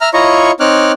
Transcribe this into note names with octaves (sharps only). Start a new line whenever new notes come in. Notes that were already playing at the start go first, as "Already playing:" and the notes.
E5 A#5 F6
E4 F4 C#5 D#5 A#5 C#6
C4 D#4 C#5 D6 F6 F#6